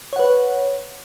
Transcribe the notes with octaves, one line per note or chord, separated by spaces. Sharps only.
B4 C#5 F#5